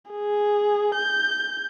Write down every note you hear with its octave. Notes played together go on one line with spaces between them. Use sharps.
G#4
G6